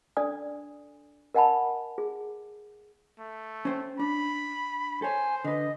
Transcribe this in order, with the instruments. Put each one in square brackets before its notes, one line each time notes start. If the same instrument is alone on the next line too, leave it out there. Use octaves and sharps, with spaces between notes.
[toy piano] D4 A4 D5 G#5 D#6
A#4 D#5 F#5 G#5 A5 B5
G#4
[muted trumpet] A3
[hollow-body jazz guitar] C#4 C5 G5
[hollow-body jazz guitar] D4 [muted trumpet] B5
[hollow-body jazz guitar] A4 C#5 [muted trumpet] C5 [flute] G#5
[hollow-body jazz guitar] D3 B4 [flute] D#5